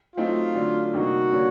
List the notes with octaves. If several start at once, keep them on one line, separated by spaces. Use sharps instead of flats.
F#3 A3 C4 D#4 F4
D3 F#3 A3
C3 D#3 G3 A#3 D#4 F#4
D3 G3 A#3 C#4